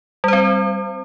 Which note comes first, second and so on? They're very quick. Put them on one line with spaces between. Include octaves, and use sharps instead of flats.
G3 C5 C4